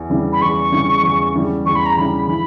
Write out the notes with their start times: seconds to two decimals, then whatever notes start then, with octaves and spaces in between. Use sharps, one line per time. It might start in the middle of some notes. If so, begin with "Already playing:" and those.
Already playing: E2
0.10 C#3 E3 G3
0.33 B5
0.41 E2 C#6
0.72 C#3 E3 G3
1.03 E2
1.34 C#3 E3 G3
1.66 E2 C#6
1.75 B5
1.86 A#5
1.96 C#3 E3 G3 B5
2.27 E3 B5